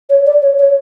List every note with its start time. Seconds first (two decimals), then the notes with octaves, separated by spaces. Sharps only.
0.10 C#5
0.26 D5
0.42 C#5
0.59 C#5